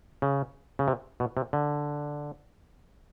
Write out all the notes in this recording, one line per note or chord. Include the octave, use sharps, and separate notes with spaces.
C#3
C#3
C3
B2
C3
D3